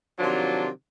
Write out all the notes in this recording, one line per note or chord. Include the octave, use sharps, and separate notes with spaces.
C3 D#3 F3 F#3 D4 F4